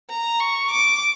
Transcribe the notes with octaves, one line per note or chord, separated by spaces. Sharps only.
A#5
C#6
D6